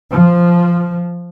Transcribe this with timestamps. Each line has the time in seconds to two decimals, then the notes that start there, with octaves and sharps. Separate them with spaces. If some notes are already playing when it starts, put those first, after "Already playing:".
0.12 F3